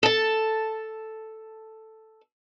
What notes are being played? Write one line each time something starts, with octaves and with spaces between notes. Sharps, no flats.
A4 A5